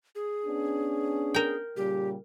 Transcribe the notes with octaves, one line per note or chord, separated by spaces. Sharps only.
G#4
B3 C#4 D4
A#4 G5
A#2 C#3 G3 G4